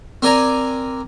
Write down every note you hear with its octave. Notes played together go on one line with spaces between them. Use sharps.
C4 A#4 D5 G#5 A#5